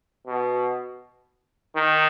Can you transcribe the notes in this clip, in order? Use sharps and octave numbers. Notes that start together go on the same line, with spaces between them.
B2
D#3